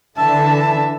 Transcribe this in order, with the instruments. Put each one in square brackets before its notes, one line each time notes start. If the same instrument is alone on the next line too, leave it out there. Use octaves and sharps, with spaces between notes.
[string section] D3 [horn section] E3 E5 [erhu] A5